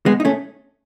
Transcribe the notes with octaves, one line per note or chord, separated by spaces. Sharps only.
G#3 B3
D#4
A3 C#4